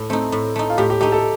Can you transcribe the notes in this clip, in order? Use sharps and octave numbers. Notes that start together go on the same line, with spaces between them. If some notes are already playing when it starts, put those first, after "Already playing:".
Already playing: A2
A3 C4 D#4
A2
A3 D#4
F4
A2 G4
G4
A3 D#4 G4
A4